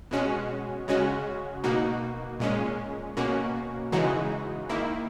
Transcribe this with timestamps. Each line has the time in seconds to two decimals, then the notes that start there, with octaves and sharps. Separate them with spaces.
0.11 B2 G#3 C#4 F#4
0.88 C#3 G#3 C#4 F#4
1.64 B2 A#3 D#4 F#4
2.40 A#2 G#3 C#4
3.17 B2 A#3 C#4 F#4
3.92 C#3 E3 G#3 D#4 F#4
4.69 D#3 A#3 E4